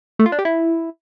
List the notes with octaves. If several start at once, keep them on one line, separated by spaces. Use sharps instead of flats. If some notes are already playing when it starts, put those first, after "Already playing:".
A3
F4
D4
G4
E4